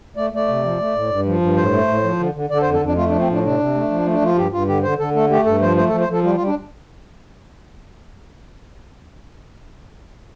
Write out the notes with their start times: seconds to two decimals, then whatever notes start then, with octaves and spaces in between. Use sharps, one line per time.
0.16 A3 D5
0.33 A3 D5
0.48 C3
0.63 F3
0.79 A3
0.95 A2
1.10 G2
1.26 F3
1.41 G2
1.56 A2 C5
1.72 A3
1.88 A2
2.03 F3
2.19 D3
2.34 D3
2.50 D3 D5
2.57 A4
2.62 C5
2.66 F2
2.73 A4
2.81 F2 D4
2.97 A3 F4
3.09 D4
3.12 F3
3.20 C4
3.28 A2 D4
3.43 C3 D4
3.59 C3
3.75 A3
3.90 F3
4.06 A3 D4
4.21 F3 F4
4.36 G2 G4
4.52 G2 F4
4.67 D3 G4
4.83 D3 C5
4.99 D3 A4
5.14 A3 A4
5.30 A3 G4
5.46 G2 A4
5.61 F3 C5
5.77 A3 C5
5.88 A4
5.92 F3
6.00 C5
6.08 F3 A4
6.23 G3 F4
6.35 F4
6.39 G3
6.47 D4